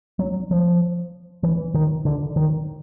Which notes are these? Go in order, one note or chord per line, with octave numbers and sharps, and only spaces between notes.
F#3
F3
E3
D#3
D3
D#3